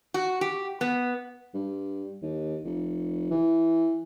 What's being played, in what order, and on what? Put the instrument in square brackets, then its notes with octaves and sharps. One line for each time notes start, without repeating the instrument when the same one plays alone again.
[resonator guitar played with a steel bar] F#4
G4
B3
[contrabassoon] G2
D#2
F1
E3